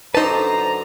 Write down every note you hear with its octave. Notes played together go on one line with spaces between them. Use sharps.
F#2 D3 D#4 B4 C5 D5 A5 A#5